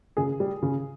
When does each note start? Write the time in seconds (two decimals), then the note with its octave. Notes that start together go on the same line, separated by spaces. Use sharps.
0.17 C#3 G#4
0.40 G3
0.62 C#3